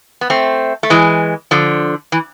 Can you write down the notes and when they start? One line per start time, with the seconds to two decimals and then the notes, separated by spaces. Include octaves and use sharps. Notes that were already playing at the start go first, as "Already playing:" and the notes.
0.21 B3
0.30 A3 C4
0.83 A3
0.90 E3 G#3
1.51 D3 F3
2.12 E3